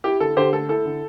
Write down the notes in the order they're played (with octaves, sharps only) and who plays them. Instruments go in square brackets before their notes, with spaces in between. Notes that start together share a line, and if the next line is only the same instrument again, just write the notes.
[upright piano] E4 G4
D3 A4
D3 G4 C5
A3 A4
E4 A4
D3